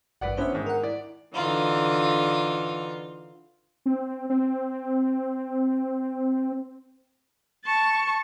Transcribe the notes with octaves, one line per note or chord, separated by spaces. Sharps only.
A1 G2 B4 D5 F#5
D3 B3 C#4 C5 E5
G#2 D#3
A#4 F#5
E4 D5
D3 E3 D#4 F4
C4
C4
A5 C#6